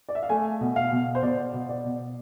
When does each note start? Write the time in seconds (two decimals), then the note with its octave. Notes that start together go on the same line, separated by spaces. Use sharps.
0.09 D5
0.15 E5
0.23 F5
0.29 A3 G#5
0.61 B2
0.76 F5
0.92 B2
1.15 C5
1.22 B2 D5
1.54 B2
1.69 D5
1.85 B2